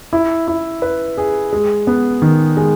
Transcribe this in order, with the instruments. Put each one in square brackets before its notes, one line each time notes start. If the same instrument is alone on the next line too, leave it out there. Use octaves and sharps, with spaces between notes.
[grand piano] E4
E4
B4
G#4
G#3
B3
D#3
G#3